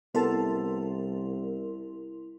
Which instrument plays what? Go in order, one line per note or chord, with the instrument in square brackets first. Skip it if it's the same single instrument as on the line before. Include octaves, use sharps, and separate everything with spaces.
[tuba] C2 [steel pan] B3 A4 A5 [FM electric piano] E4 A#4 C6